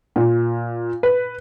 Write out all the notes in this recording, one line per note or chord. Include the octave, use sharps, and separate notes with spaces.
A#2
B4